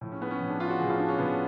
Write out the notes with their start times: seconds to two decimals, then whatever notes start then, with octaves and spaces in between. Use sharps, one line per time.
0.01 A2 F3
0.12 C#4
0.22 B3
0.31 C#4
0.40 A2 F3
0.50 D4
0.60 F4
0.70 F#4
0.79 A2 F3 G#4
0.89 F4
0.99 D4
1.08 C#4
1.18 A2 F3 B3
1.28 C#4